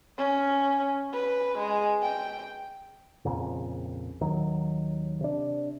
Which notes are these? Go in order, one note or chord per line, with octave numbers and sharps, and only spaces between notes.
C#4
B4
G#3
G5
A#1 F2 A#2 C#3
D#2 D#3 F#3
C3 D4